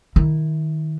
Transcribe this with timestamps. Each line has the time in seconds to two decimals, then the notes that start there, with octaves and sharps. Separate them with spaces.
0.16 D#3 E4